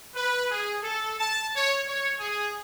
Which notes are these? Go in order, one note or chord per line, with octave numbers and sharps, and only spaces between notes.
B4
G#4
A4
A5
C#5
C#5
G#4